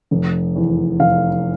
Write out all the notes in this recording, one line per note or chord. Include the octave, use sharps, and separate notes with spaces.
F1
E2
F1 F5